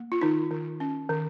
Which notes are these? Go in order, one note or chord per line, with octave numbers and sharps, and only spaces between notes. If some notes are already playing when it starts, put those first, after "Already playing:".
Already playing: A#3
F4
D#3 D#4
D#3
C#4
D#3